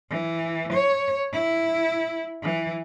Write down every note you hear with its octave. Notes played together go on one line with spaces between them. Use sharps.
E3
C#5
E4
E3